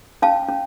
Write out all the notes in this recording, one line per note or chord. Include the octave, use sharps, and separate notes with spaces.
C#4 F5 A5
C#4